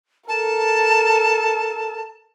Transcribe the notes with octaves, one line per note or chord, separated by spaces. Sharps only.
A4 A#4 A5